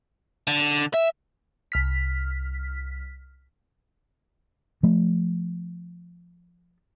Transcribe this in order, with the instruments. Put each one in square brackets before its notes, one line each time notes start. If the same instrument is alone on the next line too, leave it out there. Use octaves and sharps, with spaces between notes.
[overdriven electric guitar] D3
E5
[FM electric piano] C2 F6 B6
[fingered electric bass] F3 A3